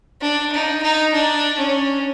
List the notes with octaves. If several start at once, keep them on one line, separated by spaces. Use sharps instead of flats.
D4
D#4
D#4
D4
C#4